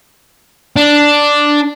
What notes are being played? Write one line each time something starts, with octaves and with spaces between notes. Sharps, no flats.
D4